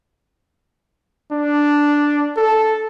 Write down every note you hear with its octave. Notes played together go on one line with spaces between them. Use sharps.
D4
A4